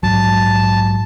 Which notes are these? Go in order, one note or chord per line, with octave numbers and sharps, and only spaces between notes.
A#1 G#2 F#3 A5